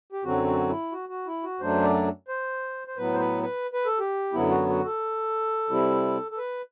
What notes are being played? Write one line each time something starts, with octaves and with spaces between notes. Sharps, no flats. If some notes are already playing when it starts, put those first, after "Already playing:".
G4
F#2 D3 F#3 C4 F#4
F#4
E4
F#4
F#4
E4
F#4
F#2 F#3 A3 D4 C5
D5
C5
C5
A2 F#3 B3 B4
C5
B4
B4
B4
A4
G4
F#2 D3 F#3 B3 E4
F#4
F#4
A4
C3 G3 C4 E4
A4
B4